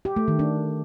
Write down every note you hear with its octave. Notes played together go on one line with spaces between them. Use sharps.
G4
A3
D#3
D4